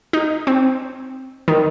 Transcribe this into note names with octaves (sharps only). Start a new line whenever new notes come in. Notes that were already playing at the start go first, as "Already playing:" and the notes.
D#4
C4
D#3